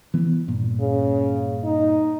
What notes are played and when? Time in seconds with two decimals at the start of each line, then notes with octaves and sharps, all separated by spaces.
0.14 E3 B3
0.48 G2 A#2
0.80 C#3
1.65 D#4